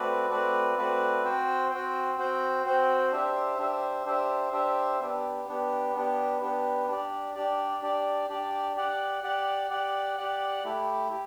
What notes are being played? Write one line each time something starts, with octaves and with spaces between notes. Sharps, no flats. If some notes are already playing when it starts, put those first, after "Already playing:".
Already playing: A3 C4 F#4 B4 D5
A3 C4 F#4 B4 D5
A3 C4 F#4 B4 D5
C4 F#4 C5 G5
C4 F#4 C5 G5
C4 F#4 C5 G5
C4 F#4 C5 G5
D4 G4 C5 E5
D4 G4 C5 E5
D4 G4 C5 E5
D4 G4 C5 E5
B3 D4 G4
B3 D4 G4
B3 D4 G4
B3 D4 G4
D4 G4 D5
D4 G4 D5
D4 G4 D5
D4 G4 D5
G4 D5 F#5
G4 D5 F#5
G4 D5 F#5
G4 D5 F#5
A3 E4 G4
G4